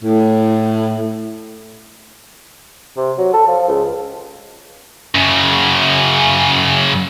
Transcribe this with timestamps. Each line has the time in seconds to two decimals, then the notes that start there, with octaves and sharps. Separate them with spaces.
0.03 A2
2.97 C3
3.18 F#3
3.33 A4
3.47 F3
3.68 C#2
5.15 F#2 C#3